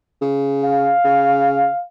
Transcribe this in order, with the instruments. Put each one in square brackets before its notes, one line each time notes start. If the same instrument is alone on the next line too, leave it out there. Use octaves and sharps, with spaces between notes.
[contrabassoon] C#3
[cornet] F5
[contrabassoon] C#3